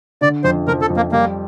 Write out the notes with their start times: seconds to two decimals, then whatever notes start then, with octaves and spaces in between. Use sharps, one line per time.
0.21 D3 D5
0.44 F2 C5
0.68 F3 A#4
0.81 A4
0.90 F2
0.97 A#3
1.12 G3 A#3